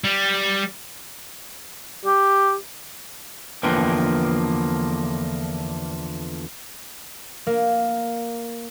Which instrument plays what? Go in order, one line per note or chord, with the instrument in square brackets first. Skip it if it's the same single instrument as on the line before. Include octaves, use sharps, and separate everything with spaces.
[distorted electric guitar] G3
[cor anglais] G4
[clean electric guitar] E2 D3 F3 A#3 B4 G5
[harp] A#3